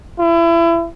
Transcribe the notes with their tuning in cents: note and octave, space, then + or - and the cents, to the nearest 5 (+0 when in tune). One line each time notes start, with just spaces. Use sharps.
E4 +30